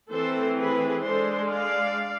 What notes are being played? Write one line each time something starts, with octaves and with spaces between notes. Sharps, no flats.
E3 A3 C4 A4 C5
G#4 B4
G#3 D4 A4 C5
D5 F5